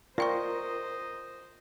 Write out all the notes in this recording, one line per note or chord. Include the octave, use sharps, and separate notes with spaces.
F4 A#4 C5 D5 D#5 G5 C#6